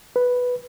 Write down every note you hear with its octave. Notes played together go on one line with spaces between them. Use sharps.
B4